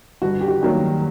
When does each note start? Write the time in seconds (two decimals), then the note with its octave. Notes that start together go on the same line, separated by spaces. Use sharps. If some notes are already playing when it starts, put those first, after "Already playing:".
0.22 G1 F#4
0.41 G4
0.48 F#4
0.61 G2 D#3 F#3 A#3